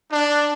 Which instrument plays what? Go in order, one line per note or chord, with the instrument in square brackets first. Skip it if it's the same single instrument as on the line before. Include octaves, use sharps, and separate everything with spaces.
[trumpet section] D4